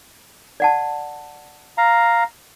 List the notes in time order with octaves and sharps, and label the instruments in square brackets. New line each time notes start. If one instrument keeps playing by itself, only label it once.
[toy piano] D5 F#5 A5
[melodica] F5 A#5